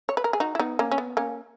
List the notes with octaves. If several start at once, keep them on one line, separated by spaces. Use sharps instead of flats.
C#5
B4
A#4
G#4
D#4 F#4
E4
B3 D#4
A#3 C#4
C#4
B3
A#3 C#4